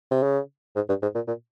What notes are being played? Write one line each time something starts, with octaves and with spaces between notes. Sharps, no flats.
C3
C#3
G#2
G2
G#2
A#2
A#2